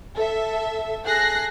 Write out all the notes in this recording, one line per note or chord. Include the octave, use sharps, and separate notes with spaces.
A4 E5
G#4 A4 F#6 A#6 C7